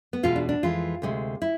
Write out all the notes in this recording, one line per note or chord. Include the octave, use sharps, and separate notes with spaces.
B3
E2 B2 G#3 F4
D4
D4
F2 E3 G#3 F4
D2 C3 G#3
E4